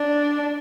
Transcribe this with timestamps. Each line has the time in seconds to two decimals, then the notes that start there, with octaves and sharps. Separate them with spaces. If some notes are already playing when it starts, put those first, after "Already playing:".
Already playing: D4